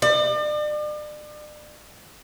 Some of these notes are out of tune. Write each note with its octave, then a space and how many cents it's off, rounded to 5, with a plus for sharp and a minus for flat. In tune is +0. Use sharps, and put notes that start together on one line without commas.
D5 +40